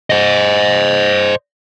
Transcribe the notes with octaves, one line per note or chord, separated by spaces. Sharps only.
C5 D#5